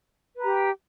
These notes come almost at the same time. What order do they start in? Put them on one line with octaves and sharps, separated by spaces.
B4 A#5 G4 G5